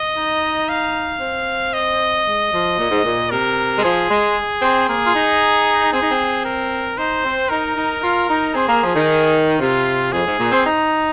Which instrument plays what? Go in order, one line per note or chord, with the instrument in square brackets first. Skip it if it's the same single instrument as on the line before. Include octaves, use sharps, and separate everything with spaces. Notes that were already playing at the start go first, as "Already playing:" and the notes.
Already playing: [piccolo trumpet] D#5
[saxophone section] D#4
[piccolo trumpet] F5
[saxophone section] C4
[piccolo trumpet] D#5
[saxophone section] G#3
F3
A#2
G#2
A#2
[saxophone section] C3 [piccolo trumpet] A#4
[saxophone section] G#3
[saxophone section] F3 [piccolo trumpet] G#4
[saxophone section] G#3
C4
[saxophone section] A#3 [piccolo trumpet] G#4
[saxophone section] F4
D#4
[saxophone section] C4 [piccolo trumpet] G#4
[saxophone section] D#4
C4
[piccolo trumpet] A#4
[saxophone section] D#4 [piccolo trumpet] C5
[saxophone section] C4
[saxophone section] D#4 [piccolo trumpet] A#4
[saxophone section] D#4
F4
D#4
[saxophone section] C4 [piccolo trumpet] G#4
[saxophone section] A#3
F3
D#3
[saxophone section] C3 [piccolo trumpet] F4
[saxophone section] F2 [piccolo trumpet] G#4
[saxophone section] G#2
A#2
C4
D#4